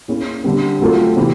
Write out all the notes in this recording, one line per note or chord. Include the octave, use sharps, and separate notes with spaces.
A#3 C#4 E4 G#4
D3 G3 C4
F#3 A3 C4 F4 A4
C3 E3